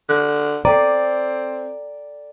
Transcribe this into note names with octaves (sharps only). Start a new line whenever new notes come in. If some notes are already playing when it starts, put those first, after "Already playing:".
D3
C4 A4 D5 G5 A#5